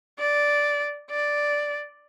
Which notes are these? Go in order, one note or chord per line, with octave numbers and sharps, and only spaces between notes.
D5
D5